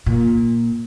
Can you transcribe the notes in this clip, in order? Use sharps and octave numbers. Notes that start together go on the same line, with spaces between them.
A#2